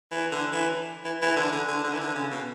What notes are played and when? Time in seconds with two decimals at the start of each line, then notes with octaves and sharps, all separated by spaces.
0.12 E3
0.32 D3
0.52 E3
1.05 E3
1.22 E3
1.36 D3
1.52 D3
1.68 D3
1.84 D3
1.94 E3
2.00 D3
2.15 C#3
2.31 B2